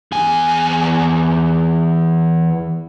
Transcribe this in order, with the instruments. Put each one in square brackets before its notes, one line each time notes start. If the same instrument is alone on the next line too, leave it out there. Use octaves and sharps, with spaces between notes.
[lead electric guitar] E2 G#5